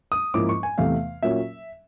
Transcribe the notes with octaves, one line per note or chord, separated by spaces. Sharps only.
D#6
G#2 F3 A#3 C#4 E4 D6
C#6
G#5
E2 C3 E3 A3 F5
A#2 F#3 A#3 C#4 E5